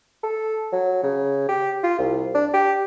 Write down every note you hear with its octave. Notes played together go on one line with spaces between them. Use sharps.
A4
F#3
C#3
G4
F4
C2
D4
G4